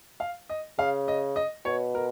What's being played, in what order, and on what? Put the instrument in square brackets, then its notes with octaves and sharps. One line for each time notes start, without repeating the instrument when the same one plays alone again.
[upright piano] F5
D#5
[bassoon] C#3 [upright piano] F5
[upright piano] D#5
D#5
[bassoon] B2 [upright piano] C#5
[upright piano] A#4